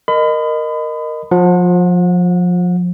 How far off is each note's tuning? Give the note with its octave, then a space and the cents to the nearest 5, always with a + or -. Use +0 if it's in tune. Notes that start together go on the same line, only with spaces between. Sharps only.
A#4 +0 D#5 -15 B5 +35
F3 +25 F#5 -30